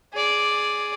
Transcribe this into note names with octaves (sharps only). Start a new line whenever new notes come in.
G#4 D5